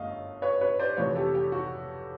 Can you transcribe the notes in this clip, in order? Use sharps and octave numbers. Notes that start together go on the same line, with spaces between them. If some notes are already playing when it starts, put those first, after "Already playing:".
Already playing: G1 F#2 A3 D#5 F5
B4 C#5
B4 C#5
C5 D5
F1 F2 C3 E3 A3 B4 C#5
G4 A4
G4
F#4